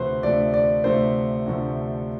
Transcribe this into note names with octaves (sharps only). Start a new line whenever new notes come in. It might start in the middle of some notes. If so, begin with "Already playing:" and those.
Already playing: D2 C3 F3 A3 B4 C5
D2 C3 F3 A3 D5
D5
D2 C3 F3 A3 C5
D2 C3 F3 A3